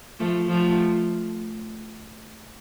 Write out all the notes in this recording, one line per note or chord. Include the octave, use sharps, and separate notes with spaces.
F3 A3
F3 A3